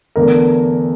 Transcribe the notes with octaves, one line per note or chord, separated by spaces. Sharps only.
E2 D3 A3 A#4